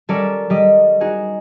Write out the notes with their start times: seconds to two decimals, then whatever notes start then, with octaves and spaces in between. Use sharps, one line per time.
0.09 G3 C#4 A4 A#4 C#5 D5
0.50 G3 D#5
1.01 D#4 F#4 G#4